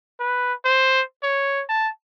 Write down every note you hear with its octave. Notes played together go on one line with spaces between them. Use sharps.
B4
C5
C#5
A5